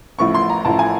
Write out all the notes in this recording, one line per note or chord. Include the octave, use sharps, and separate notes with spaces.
A1 A2 F3 A3 C#6
C6
A#5
A1 A2 F3 A3 A5
G#5